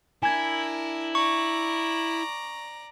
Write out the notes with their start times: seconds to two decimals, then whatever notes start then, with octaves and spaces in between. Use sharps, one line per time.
0.23 D4 E4 A#4 G#5 G#6
1.15 D5 A#5 C#6